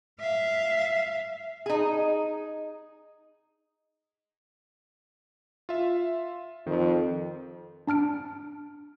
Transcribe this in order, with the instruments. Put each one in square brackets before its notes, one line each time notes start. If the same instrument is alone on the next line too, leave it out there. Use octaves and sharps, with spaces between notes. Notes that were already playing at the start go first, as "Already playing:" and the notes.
[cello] E5 F5
[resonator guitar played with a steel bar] D#4 G#4
[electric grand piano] F4 E5
[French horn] F2 [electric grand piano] D#3
[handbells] D4 A5 F6 D7